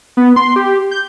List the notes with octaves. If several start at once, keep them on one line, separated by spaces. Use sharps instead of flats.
B3
C6
G4
G6